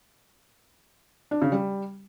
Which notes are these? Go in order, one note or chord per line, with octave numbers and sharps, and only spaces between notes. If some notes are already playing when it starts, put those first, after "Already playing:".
D4
C#3
G3